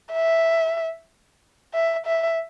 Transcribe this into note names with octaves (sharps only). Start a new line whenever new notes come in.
E5
E5
E5